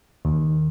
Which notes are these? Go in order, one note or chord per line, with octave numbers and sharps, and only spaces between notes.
D#2